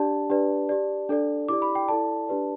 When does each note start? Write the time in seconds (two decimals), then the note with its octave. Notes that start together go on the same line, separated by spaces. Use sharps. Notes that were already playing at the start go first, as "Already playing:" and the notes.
Already playing: D4 G4 D5 A5
0.30 D4 G4 B4 D5
0.69 G4 D5
1.09 D4 A4 D5
1.48 E4 G4 D5 D6
1.62 B5
1.75 G5
1.89 E4 A4 D5 A5
2.29 D4 G4 B4 D5